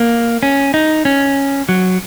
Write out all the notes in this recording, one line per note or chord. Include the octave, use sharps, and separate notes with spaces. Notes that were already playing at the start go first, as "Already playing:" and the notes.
Already playing: A#3
C#4
D#4
C#4
F#3